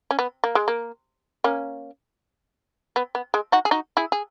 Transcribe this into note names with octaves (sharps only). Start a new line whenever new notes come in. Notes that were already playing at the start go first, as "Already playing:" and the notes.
C#4
B3
A#3
G#3
A#3
A#3 C#4
B3
B3
G#3
D#4 F#4
G#4
D#4 F#4
E4 G#4
G#4